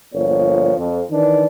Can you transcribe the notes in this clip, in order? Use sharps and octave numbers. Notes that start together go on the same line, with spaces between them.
G1 A#2 F3 C#5
F2
D#3 E3 D4